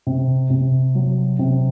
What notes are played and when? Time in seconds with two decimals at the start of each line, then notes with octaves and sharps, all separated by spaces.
0.07 C3
0.50 C3
0.95 F#3
1.39 C3